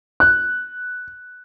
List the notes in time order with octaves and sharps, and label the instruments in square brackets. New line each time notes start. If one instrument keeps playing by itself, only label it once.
[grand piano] F#6